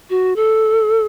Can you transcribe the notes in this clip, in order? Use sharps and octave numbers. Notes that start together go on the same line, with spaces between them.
F#4
A4